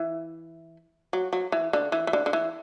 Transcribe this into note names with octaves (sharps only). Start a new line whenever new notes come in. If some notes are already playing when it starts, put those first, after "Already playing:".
Already playing: E3
F#3
F#3
E3
D3
E3
E3
D3
D3
E3